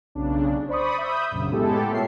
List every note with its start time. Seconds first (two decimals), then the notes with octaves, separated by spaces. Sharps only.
0.15 B1 C#3 D4
0.69 C5 D5 B5 C#6 D#6
0.98 E5 B5 D#6 G6
1.31 A#1 F#2 C#3
1.50 A2 G#3 B3 E4 G4 A4
1.91 A#2 A#4 C#5 E5 A5 C7